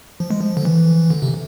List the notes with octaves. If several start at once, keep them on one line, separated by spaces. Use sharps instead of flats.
F3
G#3
F3
D3
E3
D3
C3